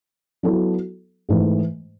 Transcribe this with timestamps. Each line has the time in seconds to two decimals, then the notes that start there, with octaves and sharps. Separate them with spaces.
0.43 F#3 B3 E4 A4
1.29 G#2 E3 A3